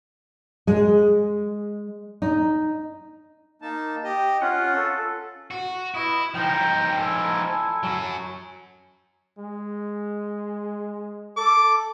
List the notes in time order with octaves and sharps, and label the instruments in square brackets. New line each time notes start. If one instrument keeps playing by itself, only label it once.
[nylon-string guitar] G#3
D#4
[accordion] A#3 D#4 A5
G4 D#5
[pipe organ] C#4 F#5 [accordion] F4
[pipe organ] A4
[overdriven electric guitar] F#4
[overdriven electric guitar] E4 [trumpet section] B4 D#5
[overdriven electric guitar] F3 D#4 [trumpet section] G5
[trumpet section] E4 A4 G#5
[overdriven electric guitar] F#3 C#4
[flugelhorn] G#3
[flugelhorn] A4 [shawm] D6